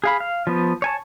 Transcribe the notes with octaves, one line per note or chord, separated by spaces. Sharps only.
G#4 F5 B5
F5
F3 B3
C#5 G#5 A5